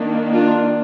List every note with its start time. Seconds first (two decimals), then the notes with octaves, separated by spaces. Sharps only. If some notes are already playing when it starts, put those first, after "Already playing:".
Already playing: D#3 A#3 D4
0.32 D4 F4